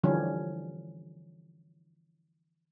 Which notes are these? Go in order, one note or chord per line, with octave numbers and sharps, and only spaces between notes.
D3 E3 F3 G3 C#4